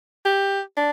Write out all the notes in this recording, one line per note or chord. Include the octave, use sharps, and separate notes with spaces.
G4
D4